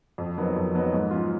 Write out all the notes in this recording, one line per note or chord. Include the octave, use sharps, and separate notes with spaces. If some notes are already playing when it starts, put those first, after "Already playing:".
F2
D#3 F#3 B3 D#4
F2
D#3 F#3 B3 D#4
G#2
F#3 C#4 F4